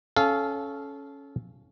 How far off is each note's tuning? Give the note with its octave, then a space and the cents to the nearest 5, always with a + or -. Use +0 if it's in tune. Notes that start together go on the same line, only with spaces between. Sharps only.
C#4 +0 A4 -25 F5 -10